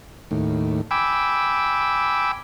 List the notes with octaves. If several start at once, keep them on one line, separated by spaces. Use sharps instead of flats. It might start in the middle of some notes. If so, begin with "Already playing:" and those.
D#2 A2
G5 G#5 B5 D6 E6